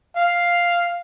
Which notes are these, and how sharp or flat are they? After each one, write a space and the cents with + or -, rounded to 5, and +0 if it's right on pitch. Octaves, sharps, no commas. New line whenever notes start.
F5 +0